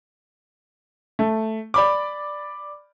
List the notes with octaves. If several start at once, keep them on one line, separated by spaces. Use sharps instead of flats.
A3
D5 B5 D6